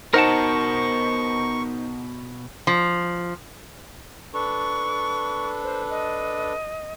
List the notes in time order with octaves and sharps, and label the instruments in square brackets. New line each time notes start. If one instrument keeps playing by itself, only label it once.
[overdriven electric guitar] B2 [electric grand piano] D#4 C5 [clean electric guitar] A#4 F#5 A5 [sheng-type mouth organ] C#6
[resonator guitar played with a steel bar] F3
[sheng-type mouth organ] D4 A4 B4 [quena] C#6
[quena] C5
D#5